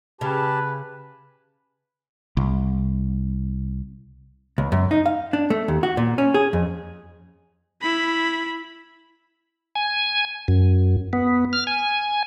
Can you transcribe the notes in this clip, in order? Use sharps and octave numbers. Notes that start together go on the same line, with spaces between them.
C#3 G4 B4 A5
C2
C#2
F#2
D#4
F5
D4
A3
D#2
F#4
A#2
C#4
G#4
F2
E4 B5
G#5
F#2
B3
F6
G#5